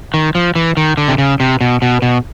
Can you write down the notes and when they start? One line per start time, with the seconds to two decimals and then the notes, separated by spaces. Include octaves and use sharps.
0.14 D#3
0.35 F3
0.55 E3
0.77 D#3
0.97 D3
1.08 C3
1.18 C#3
1.40 C3
1.61 B2
1.82 B2
2.02 B2